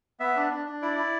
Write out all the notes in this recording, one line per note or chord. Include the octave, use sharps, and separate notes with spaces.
B3 E5
D4
D4
D4
E4 D5
E4